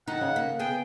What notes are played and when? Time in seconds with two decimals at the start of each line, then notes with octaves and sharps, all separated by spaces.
0.08 D#3 D#4 A4 F#5
0.21 C#3
0.36 A#3
0.59 B3 G#4 G5